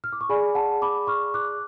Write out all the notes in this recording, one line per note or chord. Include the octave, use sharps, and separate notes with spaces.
F6
D6
C#6
G#4 D5 G#5 B5
F#5 A5
B5 D6
C#6 F6
D6 F#6